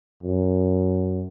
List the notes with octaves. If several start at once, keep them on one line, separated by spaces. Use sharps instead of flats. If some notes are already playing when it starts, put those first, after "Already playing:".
F#2